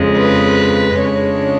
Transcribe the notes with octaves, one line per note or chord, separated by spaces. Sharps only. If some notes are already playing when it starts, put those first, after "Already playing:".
Already playing: F2 C#3 G#3
B4
F2 C#3 G#3 D4 C#5